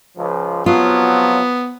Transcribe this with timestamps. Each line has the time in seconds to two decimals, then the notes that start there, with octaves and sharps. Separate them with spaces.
0.18 C#2 F3
0.66 C3 F3 F#3 B3 F4